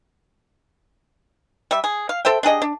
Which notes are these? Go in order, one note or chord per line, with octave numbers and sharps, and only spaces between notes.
G3 E5
G#4
F5
A4 C5 E5 G5
D4 G4 G#4 D#5
D4